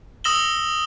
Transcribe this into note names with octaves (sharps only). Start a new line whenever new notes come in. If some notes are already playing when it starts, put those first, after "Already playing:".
D#6 E6 A#6 E7 F#7 G7